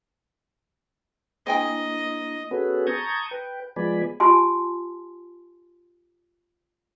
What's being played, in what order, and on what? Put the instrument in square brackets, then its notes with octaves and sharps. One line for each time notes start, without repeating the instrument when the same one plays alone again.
[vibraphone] A#3 D4 E4 [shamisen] C5 G5 G#5 [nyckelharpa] D#5
[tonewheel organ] B3 C#4 F#4 G#4 A4 B4
A5 A#5 C#6 D#6 G6 G#6
B4 G5
F3 G#3 B3 D5 G#5 B5
[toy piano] F4 G4 G#5 A5 C6